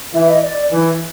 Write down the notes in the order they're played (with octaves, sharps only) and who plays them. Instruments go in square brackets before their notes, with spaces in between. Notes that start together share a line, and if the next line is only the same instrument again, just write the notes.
[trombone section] E3 [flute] E5
[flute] D#5
D5
[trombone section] E3